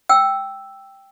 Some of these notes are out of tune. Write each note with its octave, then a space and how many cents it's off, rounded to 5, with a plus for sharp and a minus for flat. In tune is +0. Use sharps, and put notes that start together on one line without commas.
G5 +0 E6 +0